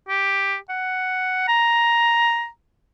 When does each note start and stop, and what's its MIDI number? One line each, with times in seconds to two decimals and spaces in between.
0.09 0.56 67
0.70 1.44 78
1.48 2.48 82